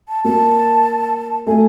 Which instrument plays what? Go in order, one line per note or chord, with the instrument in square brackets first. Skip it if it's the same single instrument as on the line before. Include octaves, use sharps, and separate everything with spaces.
[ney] A5
[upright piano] A#3 [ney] A5
[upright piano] A3 [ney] G#5